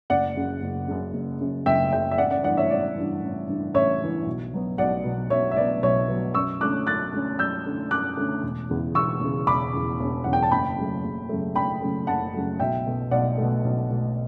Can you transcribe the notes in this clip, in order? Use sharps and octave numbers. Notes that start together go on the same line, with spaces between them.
F#1 D5 F#5
F#2 C#3
F#1
F#2 C#3
F#1
F#2 C#3
F#1 E5 G5
F#2 C#3 E5 G5
E5
A1 D5 F#5
D5 F#5
G2 E3 D5 F#5
C#5 E5
A1 D5
G2 E3
A1
G2 E3
A1 C#5 E5
G2 E3
B1
B2 F#3 B3
B1 D5 F#5
B2 F#3 B3
B1 C#5 E5
E5
B2 F#3 B3 D5
B1 C#5 E5
B2 F#3 B3
F#2 C#6 E6
D3 A3 C#4 D6 F#6
F#2 F#6 A6
D3 A3 C#4
F#2 E6 G6
D3 A3 C#4
F#2 D6 F#6
D3 A3 C#4
E1
E2 C#3
E1 C#6 E6
E2 C#3
E1 B5 D6
E2 C#3
E1
E2 C#3 F#5
G5
A5
F#1 G5 B5
F#2 C#3 F#3 A3
F#1
F#2 C#3 F#3 A3
F#1 G5 B5
F#2 C#3 F#3 A3
F#1 F#5 A5
F#2 C#3 F#3 A3
B1 E5 G5
B2 A3
B1 D5 F#5
B2 A3
B1
B2 A3